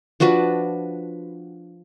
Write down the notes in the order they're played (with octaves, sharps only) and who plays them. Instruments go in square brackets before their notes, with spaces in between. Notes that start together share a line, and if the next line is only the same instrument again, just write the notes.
[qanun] F3 D4 F#4 B4